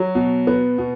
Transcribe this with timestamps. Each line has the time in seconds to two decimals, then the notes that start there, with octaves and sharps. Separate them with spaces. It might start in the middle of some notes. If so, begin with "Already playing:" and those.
Already playing: F#3
0.15 B2
0.47 B3
0.78 B2